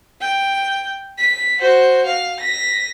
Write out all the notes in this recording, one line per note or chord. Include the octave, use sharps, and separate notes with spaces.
G5
B6
F#4 C5
F5
A#6 B6